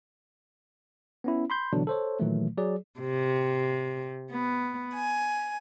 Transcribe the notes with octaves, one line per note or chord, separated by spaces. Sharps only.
B3 C#4 E4
B5 C6 G6
B2 D3 E3 F#3 D4
A4 C5 C#5
A#2 D#3 E3 F#3 A3
F#3 G#4 D5
C3
B3
G#5